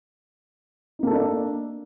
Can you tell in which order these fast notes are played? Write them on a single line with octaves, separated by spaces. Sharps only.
D#4 A#3 A4 D4 D5